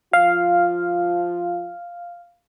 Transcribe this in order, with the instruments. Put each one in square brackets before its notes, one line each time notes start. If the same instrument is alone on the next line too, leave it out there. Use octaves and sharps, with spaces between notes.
[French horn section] F3 F4 [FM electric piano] F5